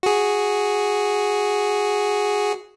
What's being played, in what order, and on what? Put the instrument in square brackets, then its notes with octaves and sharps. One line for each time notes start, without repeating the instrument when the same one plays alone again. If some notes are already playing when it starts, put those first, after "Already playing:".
[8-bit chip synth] F#4 G#4